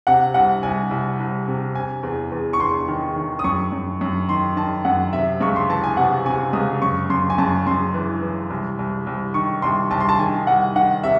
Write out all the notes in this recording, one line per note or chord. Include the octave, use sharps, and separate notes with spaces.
C3 F#5
C2 F#5
C2 G#5
C2
C2
C3
C3 G#5
E2
E2
C#6
E2 C6
D#3
D#3
D#6
F#2 C#6
F#2
F#2
D#3 C6
D#3 A5
F#2 F#5
C3 E5
C#2 C#6
C6
E3 A5
G#5
C3 F#5
C3 G#5
C#2 D#6
F#2 C#6
F#2 C6
G#5
F#2 A5
F#2 C6
E3
E3
C2
C2
C2
D#3 C#6
C2 C6
C2 A5
C6
A5
D#3 G#5
C2 F#5
D#3 F#5
C3 E5